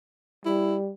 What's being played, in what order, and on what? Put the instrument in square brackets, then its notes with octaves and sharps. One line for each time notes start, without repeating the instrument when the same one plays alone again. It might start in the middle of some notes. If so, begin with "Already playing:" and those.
[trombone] G3 [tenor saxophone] E4